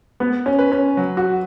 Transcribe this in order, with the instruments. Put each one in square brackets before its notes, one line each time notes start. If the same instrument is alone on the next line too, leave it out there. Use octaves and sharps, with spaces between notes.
[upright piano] B3 [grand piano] B4
[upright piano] C#4
[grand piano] B4
[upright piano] C#4
[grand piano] F#3
[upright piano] F#4